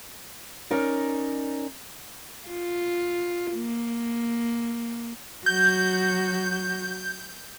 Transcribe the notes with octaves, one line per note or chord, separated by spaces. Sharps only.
C#4 D#4 A#4 D5
F4
A#3
F#3 F#4 G6